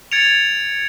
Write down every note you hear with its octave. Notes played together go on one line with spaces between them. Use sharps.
G#6 A6 C#7 D7 F7